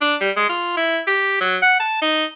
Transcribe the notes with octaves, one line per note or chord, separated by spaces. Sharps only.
D4
G3
G#3
F4
E4
G4
F#3
F#5
A5
D#4